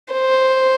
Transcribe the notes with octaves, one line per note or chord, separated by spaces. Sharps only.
C5